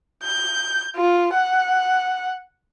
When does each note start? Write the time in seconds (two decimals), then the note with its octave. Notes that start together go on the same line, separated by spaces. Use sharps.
0.23 G6
0.96 F4
1.34 F#5